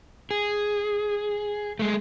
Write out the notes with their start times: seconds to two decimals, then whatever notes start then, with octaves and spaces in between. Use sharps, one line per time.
0.31 G#4
1.79 G#3 A3